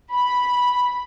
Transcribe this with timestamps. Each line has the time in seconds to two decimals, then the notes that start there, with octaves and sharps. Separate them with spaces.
0.13 B5